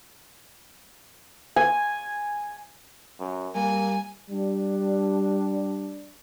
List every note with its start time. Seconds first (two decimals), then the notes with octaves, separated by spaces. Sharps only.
1.56 G#5
3.20 F#2
3.55 G3 A#3 G#5
4.30 G3 D4